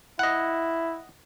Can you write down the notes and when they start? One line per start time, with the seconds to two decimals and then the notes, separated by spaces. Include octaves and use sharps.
0.19 E4 D#5 F#5